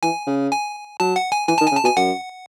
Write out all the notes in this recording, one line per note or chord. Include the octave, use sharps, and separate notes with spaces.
E3 G#5
C#3
G#5
F#3 A5
F#5
G#5
E3 G#5
D#3 A5
G#5
C#3
A5
B2 G#5
F#2 F#5